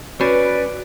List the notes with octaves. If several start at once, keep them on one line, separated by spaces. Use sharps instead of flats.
C#4 F#4 B4 D5